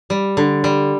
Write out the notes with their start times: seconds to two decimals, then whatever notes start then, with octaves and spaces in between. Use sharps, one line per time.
0.10 G3
0.37 D3
0.64 G3